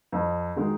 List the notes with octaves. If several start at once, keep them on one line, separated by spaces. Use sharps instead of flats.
F2
D#3 G#3 D#4 F#4